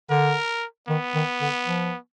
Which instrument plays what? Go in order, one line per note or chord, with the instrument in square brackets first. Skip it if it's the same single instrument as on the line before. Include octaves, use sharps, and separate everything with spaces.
[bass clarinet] D3 [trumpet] A#4
[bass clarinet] D#3 [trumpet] B3
[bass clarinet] D#3
D3
F3